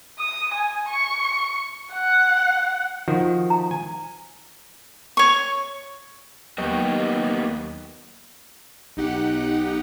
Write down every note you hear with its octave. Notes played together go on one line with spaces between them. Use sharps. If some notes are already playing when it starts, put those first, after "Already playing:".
D#6
G#5
C#6
F#5
D#3 F3 F#4
A#5
G#5
C#5 C#6
D#2 F#3 A#3 B3 G4 D#5 G5 C#6
B1 D#4 G4 F#5